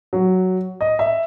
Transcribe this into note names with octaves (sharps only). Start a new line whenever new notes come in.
F#3
D#5
E5